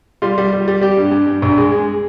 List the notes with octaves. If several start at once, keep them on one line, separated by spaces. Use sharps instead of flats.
G3 F4
G3
G3
G3
G3 G4
G2
G2
G2
A#1
G#3
G#3